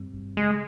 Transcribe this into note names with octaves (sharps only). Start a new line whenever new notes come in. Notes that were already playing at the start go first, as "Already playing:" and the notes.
Already playing: G2 G3 C4
G#1
C#3 G#3